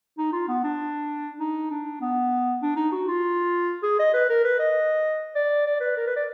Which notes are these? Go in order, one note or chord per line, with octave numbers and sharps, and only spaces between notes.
D#4
F4
B3
D4
D#4
D4
B3
D4
D#4
F#4
F4
G#4
D#5
B4
A#4
B4
D#5
D5
D5
B4
A#4
B4
D5